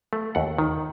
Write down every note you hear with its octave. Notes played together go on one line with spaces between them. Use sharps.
A3
D#2 F#5
D#3